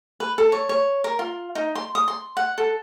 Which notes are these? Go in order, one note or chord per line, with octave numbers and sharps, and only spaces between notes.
B4
A4
C#5
C#5
A#4
F4
D#4
C6
D#6
C6
F#5
A4